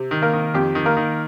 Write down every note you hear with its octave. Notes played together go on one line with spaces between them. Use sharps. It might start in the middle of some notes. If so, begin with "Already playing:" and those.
Already playing: C3
D#3
A#3 A#4
D#3
F2 G4
D#3
A#3 A#4
D#3